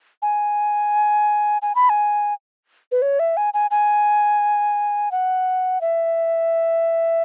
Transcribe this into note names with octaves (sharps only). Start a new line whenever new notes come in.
G#5
G#5
B5
G#5
B4
C#5
E5
G#5
G#5
G#5
F#5
E5